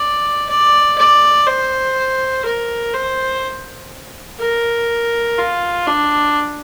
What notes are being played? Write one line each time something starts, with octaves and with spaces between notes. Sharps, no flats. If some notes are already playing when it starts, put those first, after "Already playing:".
Already playing: D5
D5
D5
C5
A#4
C5
A#4
F4
D4